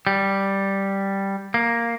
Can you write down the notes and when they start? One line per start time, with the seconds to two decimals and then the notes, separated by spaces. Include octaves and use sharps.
0.07 G3
1.54 A#3